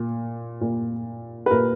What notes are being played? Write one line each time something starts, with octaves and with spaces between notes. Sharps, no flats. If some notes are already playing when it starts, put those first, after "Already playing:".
Already playing: A#2
A#2
B4
A#2 A#4